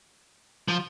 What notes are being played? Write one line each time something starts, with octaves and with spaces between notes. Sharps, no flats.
F3